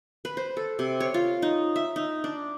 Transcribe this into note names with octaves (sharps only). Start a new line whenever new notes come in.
B4
C5
A4
C3
C#5
F4
D#4
E5
D#4
D4